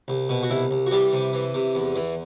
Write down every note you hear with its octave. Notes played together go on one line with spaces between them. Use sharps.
C2
B2
F#4
C2 E4
C2
F#4
E3 G3 G4
C3
E3
C3
E2
E3